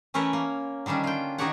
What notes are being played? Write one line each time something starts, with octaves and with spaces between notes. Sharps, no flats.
E3 A3 C#4 A#4 B4 C#5
A#3
D3 D#3 G3 C#4 D4
F4 G5
D#3 D#4 F#4 G4 C#5 F#5